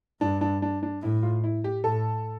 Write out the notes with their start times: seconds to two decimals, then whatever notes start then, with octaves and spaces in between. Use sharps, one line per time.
0.21 G2 D4
0.41 D4
0.62 D4
0.83 D4
1.02 A2 E4
1.23 F4
1.44 E4
1.64 G4
1.84 A2 A4